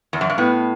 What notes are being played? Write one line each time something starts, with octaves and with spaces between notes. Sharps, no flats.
E2
F#2
G2
A2 B3